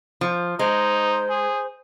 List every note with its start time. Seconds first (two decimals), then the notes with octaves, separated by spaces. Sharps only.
0.21 F3
0.59 G#3 D#4 C5
1.29 G#4